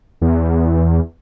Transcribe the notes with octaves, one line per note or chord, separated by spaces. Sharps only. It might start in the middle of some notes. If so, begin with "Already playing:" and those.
E2